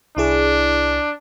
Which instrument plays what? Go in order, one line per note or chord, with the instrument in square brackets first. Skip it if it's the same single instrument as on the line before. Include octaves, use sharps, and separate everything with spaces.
[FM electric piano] C2 E4 G#4 [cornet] D4